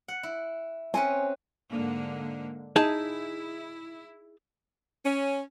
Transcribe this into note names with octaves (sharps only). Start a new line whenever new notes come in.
F#5
E4
C4 C#4 B4 G#5
G#2 D3 A#3
D#4 E4 G#4 A5
C#4